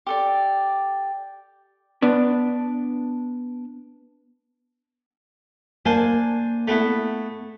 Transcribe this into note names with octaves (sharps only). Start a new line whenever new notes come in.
G4 A4 D5
B3 D4
A#3 D4 C5 G#5
A3 B3 E4